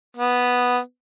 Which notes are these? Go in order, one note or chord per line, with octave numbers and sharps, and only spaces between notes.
B3